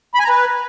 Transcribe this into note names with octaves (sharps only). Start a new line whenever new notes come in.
B5
G#5
A#5
B4